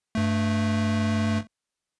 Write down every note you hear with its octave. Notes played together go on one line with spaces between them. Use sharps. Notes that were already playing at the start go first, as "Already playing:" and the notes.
G2 A3